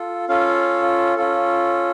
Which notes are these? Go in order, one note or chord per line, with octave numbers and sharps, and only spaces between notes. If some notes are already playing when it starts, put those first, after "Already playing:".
Already playing: F4 A4
C#4 F4 A4 F5
C#4 F4 A4